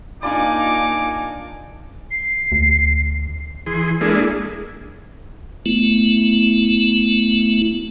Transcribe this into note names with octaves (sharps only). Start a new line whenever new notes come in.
A#3 D4 D#4 F4 D5 G#5 D6
C7
D2
E3 G#4 C6
G#3 A#3 D4 E4 G#4 A4
A3 B3 E4